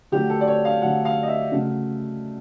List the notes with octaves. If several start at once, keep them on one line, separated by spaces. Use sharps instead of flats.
D3 F#3 A3 G4
A4
D5
C#5
F5
D3 F#3 A3 F#5
F5
D#5
E5
C#3 F#3 A3